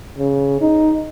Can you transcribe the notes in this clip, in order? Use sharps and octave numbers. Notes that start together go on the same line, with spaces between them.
C#3
D#4